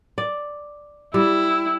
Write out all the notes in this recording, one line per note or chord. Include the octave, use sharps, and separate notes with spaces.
D5
G3 E4